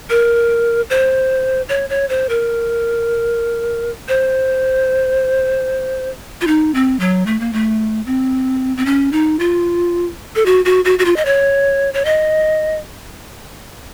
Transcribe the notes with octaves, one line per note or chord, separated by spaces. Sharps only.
A#4
C5
C#5
C#5
C5
A#4
C5
F4
D#4
C4
F#3
A3
A#3
A3
C4
C4
C#4
D#4
F4
A4
F#4
F#4
F#4
F#4
F4
D#5
C#5
C#5
D#5